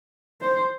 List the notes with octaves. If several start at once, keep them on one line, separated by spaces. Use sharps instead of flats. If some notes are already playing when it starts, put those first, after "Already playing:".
C5